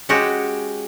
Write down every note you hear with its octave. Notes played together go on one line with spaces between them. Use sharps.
G#3 C#4 F#4 G4